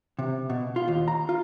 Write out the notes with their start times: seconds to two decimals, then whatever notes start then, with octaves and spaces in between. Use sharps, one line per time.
0.19 C3
0.50 B2
0.76 F4
0.88 D#2
1.08 A#5
1.29 F4